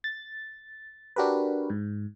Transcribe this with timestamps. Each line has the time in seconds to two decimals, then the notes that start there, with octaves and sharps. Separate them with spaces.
0.04 A6
1.16 D4 F#4 G4 A#4 B4
1.70 G#2